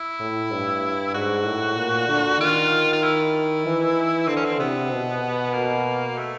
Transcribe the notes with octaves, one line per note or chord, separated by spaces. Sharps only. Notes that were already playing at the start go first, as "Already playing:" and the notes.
Already playing: E4
A2
G2
G#2 F#4
A2
A#2
D3
D#3 F4
F4
E4
E3
D3 C4
C#4
C4
C3 B3
B2
A#3
A3